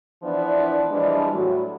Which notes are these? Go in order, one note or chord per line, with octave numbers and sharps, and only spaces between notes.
E3 F3 B3 D4 E4 D5
E3 F3 G3 G#3 D4
A2 F#3